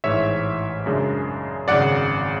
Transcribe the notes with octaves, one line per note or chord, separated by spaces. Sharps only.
A1 G#2 E3 C#5 E5
F#2 C#3 G#3 D4
G#1 F#2 C#3 D5 F#5